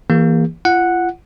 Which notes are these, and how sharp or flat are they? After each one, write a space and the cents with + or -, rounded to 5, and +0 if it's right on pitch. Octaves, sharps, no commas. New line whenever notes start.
E3 +0 A#3 +5 G#4 -45
F4 -35 F#5 -5